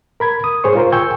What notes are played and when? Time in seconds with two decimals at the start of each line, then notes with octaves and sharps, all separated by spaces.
0.20 A#4 B5 G#6
0.44 D#6
0.64 G#2 G#4 C5 C#5 C#6
0.75 F4 A#4 C5
0.92 G5 G#5 C#6 E6 G6